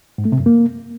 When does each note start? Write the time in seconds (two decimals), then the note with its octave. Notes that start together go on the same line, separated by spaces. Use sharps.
0.18 G#2
0.25 A3
0.32 C3
0.39 F#2
0.46 A#3